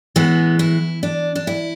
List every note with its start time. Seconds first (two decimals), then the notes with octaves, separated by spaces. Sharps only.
0.16 A2 E3 G#3 B3
0.59 E4
1.03 D4
1.35 D4
1.47 E4